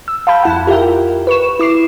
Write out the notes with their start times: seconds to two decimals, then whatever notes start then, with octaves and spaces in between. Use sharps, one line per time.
0.08 E6
0.27 F5 A5 B5 G6
0.43 F2 E4 F#5
0.67 F4 G4 A#4 E5 G5
1.27 B4 C#6 E7
1.60 E4 D6 C7 E7